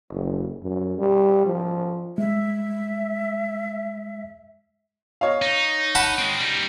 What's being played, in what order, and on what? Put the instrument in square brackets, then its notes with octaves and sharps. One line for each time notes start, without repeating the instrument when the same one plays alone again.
[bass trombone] F#1
F#2
G3
F3
[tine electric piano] G#3 [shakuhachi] E5
[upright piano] C#5 D#5 F5
[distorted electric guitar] D#4
[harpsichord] F#5 A5 B5
[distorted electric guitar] G#3 C4
G3 D#4